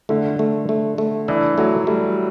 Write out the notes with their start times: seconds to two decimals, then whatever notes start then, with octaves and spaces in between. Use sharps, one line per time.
0.09 D3 A3
0.39 A3
0.69 A3
0.98 A3
1.28 E3 D4
1.58 F#3 A3
1.87 G3 A3